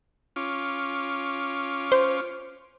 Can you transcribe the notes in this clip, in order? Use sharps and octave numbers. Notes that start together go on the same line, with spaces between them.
C#4 F4 D6
C5